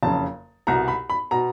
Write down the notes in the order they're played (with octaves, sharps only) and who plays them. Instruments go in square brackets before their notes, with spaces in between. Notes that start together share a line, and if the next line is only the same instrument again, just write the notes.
[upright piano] F#1 F2 C#3 A5
C2 B2 A#5
B5
B5
B2 A#5